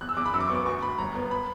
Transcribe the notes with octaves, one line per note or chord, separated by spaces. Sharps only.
E2 F#6
E6
E2 D6
B5
F#2 E6
D6
B3 C#6
D6
D2 C#6
D2 B5
G1 A#5
B3
B5